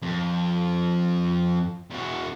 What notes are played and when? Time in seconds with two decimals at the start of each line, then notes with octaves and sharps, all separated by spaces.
0.02 F2
1.90 E2 F#4